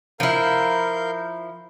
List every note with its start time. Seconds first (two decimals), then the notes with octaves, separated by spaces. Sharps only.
0.20 F3 E4 A#4 F5 G6